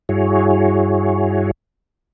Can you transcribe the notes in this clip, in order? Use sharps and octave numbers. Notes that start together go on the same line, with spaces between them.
G2 E4 F#4 G#4 C#5